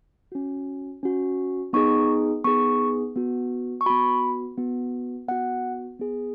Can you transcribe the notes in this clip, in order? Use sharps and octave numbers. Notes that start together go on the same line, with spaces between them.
C#4 F#4
C#4 F#4
B3 D#4 G#4 C#6
B3 D#4 G#4 C#6
B3 F#4
C#6
B3 F#4 B5
B3 F#4
B3 F#4 F#5
B3 G#4